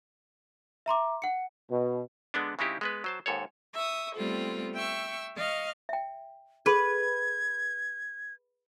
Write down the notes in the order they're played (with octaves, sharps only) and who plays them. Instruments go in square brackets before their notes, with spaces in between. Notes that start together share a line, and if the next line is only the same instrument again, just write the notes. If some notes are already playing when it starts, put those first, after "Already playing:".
[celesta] E5 A#5 C6 D6
F#5 C#7
[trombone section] B2
[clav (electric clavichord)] D3 G#3 B3 D4
C#3 G#3 C4 D#4 E4 G4
G#3 B3 B4
F#3 C5 A5
D#2 G#2 A4 C#5
[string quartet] E5 C#6 D#6
G3 A3 B3 C4 F4 A4
E5 G5 C#6 E6
D#5 F5 C#6 F6
[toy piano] E5 G5
[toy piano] G#4 A4 B5 [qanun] B4 [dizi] G#6